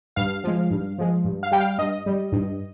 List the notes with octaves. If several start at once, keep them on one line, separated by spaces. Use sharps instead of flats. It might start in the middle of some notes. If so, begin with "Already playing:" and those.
G2 F5
F3 G#3
G2
F3 G#3
G2
F5
G3 G5
F5
G2 D#5
G3
G2